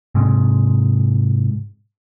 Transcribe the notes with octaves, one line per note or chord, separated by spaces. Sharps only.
G#2 C3